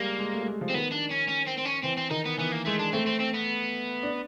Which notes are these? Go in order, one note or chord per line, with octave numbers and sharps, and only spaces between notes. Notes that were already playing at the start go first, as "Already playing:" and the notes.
Already playing: G3 G#3 A#3
G#3
A3
G3
G#3
F3
C4
D#3 B3
D4
C#4
C#4
C4
C4
C#4
E3 C4
C4
D#3 D#4
B3
E3 B3
A#3
G#3 A3
D4
A3 C4
C4
C4
B3
D4